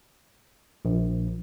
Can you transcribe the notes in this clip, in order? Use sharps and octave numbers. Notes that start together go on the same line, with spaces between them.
A#1